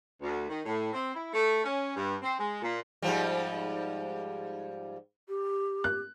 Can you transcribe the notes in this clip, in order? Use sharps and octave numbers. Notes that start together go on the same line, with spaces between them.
D2
D#3
A2
C4
E4
A3
C#4
G2
C4
G#3
A#2
G#2 F3 G3
G4
F#6